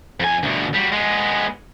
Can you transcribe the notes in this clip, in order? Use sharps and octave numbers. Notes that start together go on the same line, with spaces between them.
F2 G#5
D2 B2
G3 F#4
G#3 B3